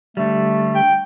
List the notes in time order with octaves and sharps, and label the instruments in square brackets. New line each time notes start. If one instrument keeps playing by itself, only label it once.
[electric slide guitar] D3 G3 [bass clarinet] A3
[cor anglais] G5